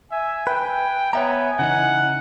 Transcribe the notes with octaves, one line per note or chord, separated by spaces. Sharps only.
E5 G#5
B4 G5
B3 C#5 E5 A#5
C#3 E3 D#4 F#5